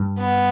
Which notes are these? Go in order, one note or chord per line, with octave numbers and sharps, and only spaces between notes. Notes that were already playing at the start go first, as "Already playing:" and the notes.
Already playing: G2
B3